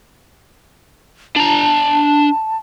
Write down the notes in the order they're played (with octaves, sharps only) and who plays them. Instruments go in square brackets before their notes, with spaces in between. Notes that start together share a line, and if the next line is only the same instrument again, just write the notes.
[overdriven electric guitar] D4 A#5 [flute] A5